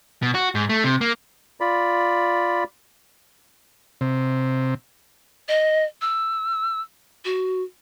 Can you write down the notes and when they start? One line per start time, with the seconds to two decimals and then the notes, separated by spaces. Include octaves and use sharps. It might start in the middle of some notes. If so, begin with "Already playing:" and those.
0.23 B2
0.35 F#4
0.55 G#2
0.70 A3
0.84 C3
1.01 A#3
1.61 F4 D5 B5
4.01 C3
5.48 D#5
6.01 E6
7.25 F#4